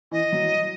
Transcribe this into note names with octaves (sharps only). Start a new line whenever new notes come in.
E3 D#5
F#3